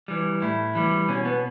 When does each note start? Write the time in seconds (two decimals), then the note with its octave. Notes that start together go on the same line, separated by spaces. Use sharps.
0.08 E3 G3
0.42 A2 E4
0.75 E3 G3
1.08 B2 C#4
1.25 B3